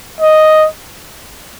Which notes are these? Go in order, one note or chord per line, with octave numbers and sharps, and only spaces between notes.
D#5